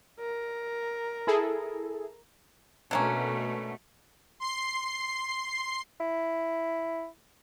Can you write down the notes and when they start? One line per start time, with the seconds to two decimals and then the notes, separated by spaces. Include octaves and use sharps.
0.19 A#4
1.27 E4 G#4 A4
2.91 B2 D3 A3 A#3 C#4
4.40 C6 C7
6.00 E4